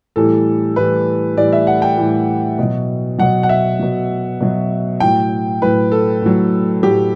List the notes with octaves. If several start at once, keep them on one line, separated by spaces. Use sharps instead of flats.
A2 E3 G3 A4
A2 E3 G3 B4
A2 E3 G3 D5
E5
F#5
G5
A2 E3 G3
B2 F#3
B2 F#3 F#5
F#5
E5
B2 F#3
B2 F#3
A2 F#3 G5
A2 F#3 B4
A4
A2 F#3
A2 F#3 G4